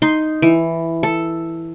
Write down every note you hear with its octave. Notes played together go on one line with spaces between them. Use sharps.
D#4 C6
E3
A4